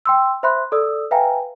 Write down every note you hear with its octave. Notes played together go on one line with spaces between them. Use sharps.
G5 C6 E6
C5 E5 B5 C6 F#6
A4 D5 D#6 E6
B4 E5 F5 G5 G#5 A#5